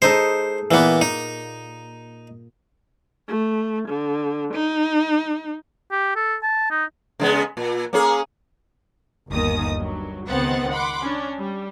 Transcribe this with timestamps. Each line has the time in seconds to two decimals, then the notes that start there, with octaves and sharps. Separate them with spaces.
0.02 G#3 D#4 A4 C5
0.71 A#2 E3 A#3 B3
1.01 D#4
3.29 A3
3.89 D3
4.54 D#4
5.92 G4
6.16 A4
6.43 A5
6.71 D#4
7.20 C#3 G#3 B3
7.57 A#2
7.93 A#3 C#4 G#4
9.29 G1 D#2 D#3 D#6
9.76 G2 F#3
10.29 C#2 D#3 B3 C4 F#5 A6
10.72 F#5 B5 C6 D6
11.02 C#4 D4
11.40 G3